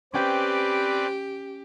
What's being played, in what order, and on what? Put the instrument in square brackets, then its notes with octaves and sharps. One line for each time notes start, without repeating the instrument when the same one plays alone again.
[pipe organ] C4 B4 D5 [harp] C#4 G5 [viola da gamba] G4